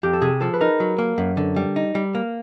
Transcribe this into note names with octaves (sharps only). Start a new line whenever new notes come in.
F2 G4
A4
C3 G#4
F3 A4
B4
D#4 A#4
F#3
A#3
F#2
D3
G3
D#4
G3
A#3